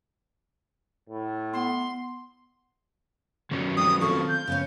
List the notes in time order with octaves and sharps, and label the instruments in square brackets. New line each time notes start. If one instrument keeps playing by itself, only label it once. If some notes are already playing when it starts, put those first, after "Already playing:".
[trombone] A2
[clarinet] B3 [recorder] C6
[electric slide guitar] D#3 F#3 C#4
[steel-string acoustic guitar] G3 A3 C4 [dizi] D#6
[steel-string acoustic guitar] C4 F4 A4 [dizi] C#6
[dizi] G6
[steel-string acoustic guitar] C#3 B3 C#4